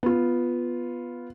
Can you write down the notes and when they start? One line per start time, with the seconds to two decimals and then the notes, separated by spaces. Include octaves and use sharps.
0.03 B3 F4